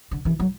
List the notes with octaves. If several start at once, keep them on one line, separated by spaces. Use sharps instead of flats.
D3
E3
F#3